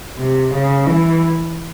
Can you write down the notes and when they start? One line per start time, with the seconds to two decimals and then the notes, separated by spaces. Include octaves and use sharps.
0.18 C3
0.53 C#3
0.86 E3